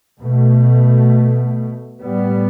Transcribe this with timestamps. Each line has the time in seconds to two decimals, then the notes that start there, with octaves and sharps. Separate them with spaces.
0.18 B2 A3
2.02 A2 G3 B3